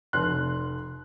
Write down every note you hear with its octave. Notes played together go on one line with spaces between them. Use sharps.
F1 C6 F#6